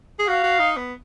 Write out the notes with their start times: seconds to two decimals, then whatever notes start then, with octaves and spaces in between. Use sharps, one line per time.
0.19 G#4
0.28 F#4 F5
0.44 F#4
0.59 D#4
0.76 B3